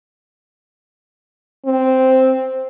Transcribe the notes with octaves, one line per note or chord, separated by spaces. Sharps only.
C4